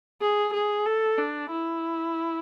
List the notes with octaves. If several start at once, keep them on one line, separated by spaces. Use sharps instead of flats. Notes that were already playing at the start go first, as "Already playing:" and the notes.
G#4
G#4
A4
D4
E4